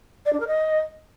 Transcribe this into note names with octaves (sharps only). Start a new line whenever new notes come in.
D5
D4
A#4
D#5